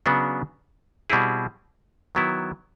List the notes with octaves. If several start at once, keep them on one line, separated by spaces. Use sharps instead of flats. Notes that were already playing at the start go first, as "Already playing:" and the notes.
C#3 F#3 B3 D4 F#4
B2 G3 C4 E4 G#4
D#3 F#3 B3 E4